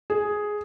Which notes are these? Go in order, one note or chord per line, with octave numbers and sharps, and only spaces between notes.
G#4